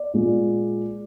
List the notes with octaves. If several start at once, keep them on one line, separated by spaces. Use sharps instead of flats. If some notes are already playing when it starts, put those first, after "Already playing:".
Already playing: D5
A#2 G#3